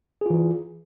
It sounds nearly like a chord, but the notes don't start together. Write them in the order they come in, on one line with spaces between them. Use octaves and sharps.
G#4 F4 E3